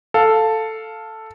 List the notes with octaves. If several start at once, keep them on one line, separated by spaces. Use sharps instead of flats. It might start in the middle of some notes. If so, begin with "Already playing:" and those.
A4 F5